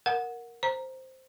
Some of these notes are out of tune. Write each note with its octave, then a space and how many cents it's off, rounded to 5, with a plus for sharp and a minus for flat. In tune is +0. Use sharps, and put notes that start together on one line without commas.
A#4 +0 F#5 -15
C5 +0 A#5 +0